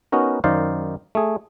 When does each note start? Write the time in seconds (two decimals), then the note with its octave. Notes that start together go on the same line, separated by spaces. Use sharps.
0.12 B3 C#4 D#4 F#4 A#4
0.44 F#2 D#3 D#4 C5 D5 F5
1.15 A3 G#4